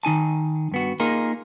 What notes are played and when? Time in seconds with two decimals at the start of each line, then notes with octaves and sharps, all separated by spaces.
0.03 D#3 D#4 G#5 A5
0.71 G2 B3 F#4
1.00 A#3 D#4 F4 G#4 A#4